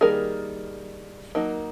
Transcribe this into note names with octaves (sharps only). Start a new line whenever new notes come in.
D#3 G3 A#3 G#4 A#4
F#3 A#3 D#4